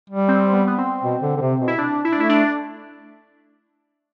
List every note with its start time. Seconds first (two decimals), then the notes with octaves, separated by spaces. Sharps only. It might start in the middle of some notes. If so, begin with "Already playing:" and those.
0.10 G3
0.28 C4
0.53 B3
0.67 B3
0.78 C4
1.03 B2
1.22 D3
1.36 D3
1.41 C3
1.60 B2
1.67 E4
1.78 D4
2.05 E4
2.12 D4
2.17 A3 E4
2.29 D4